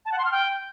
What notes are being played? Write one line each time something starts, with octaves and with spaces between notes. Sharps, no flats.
A5
F#5
C6
F6
G5